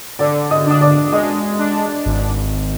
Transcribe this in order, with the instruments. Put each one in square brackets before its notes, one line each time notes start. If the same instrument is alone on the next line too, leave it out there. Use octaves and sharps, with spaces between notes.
[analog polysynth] D3 [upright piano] D5 D6
[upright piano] D#5 D#6
[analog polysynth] D4 [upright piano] D#6
[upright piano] D5 D6
[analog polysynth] G#3 [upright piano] D#5 D#6
[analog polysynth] D4
G#1